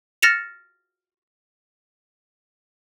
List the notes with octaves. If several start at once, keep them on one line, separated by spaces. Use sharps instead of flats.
F6 A6 A#6 C#7 E7 F7